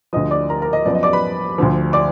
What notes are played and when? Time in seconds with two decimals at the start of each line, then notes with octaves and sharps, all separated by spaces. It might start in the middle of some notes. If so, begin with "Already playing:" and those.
0.13 D2 D3 F3 D#5 D#6
0.31 D5 D6
0.49 A#4 A#5
0.62 A#4 A#5
0.73 D#5
0.86 F#2 F3 B3 D5
0.95 D#5
1.03 D5 D6
1.13 B4 B5
1.58 D2 D3 F3
1.93 D5 D6